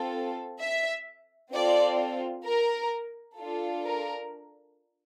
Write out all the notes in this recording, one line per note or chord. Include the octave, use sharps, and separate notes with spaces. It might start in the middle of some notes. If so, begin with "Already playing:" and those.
Already playing: C4 F4 A4
E5
C4 F4 A4 D5
A#4
D4 F4 A4
A#4